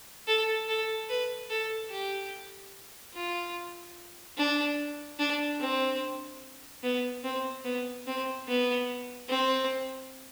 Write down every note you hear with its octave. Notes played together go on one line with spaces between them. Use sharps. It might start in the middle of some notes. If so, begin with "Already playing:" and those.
A4
A4
B4
A4
G4
F4
D4
D4
C4
B3
C4
B3
C4
B3
C4